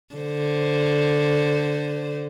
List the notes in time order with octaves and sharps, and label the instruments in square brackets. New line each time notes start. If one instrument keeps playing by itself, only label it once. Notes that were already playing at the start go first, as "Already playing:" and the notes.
[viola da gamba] D3 C5